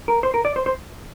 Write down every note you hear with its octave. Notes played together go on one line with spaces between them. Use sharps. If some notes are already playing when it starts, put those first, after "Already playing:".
A#4
C5
A#4
D5
C5
C5